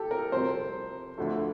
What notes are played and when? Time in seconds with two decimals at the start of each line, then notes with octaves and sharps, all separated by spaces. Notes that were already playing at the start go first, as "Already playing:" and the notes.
Already playing: G4 A4
0.11 A#4
0.32 F2 C3 G3 C5
1.18 D2 D3 F3 A3